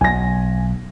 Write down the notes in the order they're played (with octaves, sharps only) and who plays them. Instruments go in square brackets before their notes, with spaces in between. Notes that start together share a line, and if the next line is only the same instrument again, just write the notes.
[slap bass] B1 [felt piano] G#5 A#6